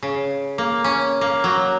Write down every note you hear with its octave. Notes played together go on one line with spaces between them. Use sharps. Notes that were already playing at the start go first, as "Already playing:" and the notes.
C#3
A#3
C#4
A#3
F#3